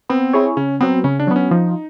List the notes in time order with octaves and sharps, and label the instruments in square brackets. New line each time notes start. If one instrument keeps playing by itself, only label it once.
[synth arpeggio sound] B3 [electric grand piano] C4
[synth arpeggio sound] E4 G#4 C#5
[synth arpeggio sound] C#3 [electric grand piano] C#4
[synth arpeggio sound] F#3 B3 [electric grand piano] C4
[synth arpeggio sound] C#3 [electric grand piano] C#4
[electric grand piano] D4
[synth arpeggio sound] F#3 B3
[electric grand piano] C#4
[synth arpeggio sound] F3 [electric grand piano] D#4